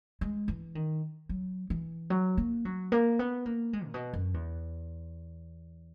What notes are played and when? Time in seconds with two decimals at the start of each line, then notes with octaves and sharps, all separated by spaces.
0.21 G#3
0.48 E3
0.75 D#3
1.29 F#3
1.70 E3
2.10 F#3
2.37 A#3
2.65 F#3
2.92 A#3
3.19 B3
3.46 A#3
3.73 G#3
3.86 A#2
3.94 B2
4.13 F#2
4.34 E2